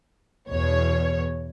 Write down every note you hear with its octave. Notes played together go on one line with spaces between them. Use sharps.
E2 B2 C#5